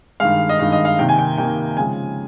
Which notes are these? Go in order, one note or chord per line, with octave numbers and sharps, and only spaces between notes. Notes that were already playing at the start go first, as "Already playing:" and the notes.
G2 D#3 G#3 F5
D#5
G2 D#3 G#3 F5
D#5
F5
C3 D#3 A#3 D#4 G5
G#5
G5
C3 D#3 A#3 D#4 G5
C#3 F3 G#3 D#4 G#5